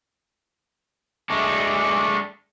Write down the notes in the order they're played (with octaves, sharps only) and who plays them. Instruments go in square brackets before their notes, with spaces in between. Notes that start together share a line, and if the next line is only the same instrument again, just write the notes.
[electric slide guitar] G#3 A3 D4